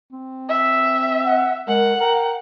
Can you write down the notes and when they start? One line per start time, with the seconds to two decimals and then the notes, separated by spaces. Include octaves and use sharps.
0.13 C4
0.49 E5
1.25 F#5
1.68 G#3 A#4 F#5
2.00 A#4 G5